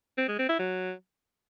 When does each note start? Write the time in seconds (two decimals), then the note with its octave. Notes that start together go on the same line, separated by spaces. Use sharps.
0.18 C4
0.28 G#3
0.39 C4
0.49 E4
0.59 F#3